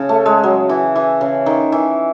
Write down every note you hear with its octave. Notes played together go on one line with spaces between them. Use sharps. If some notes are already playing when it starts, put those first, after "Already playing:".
Already playing: C#3
A3
G#3
F#3
E3
E3
C#3
D#3
E3